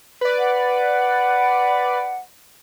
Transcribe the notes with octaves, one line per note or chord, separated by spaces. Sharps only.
B4 D5
F#5